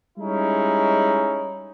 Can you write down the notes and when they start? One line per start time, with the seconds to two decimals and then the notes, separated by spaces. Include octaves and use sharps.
0.18 G3 G#3 C#4 D#4 E4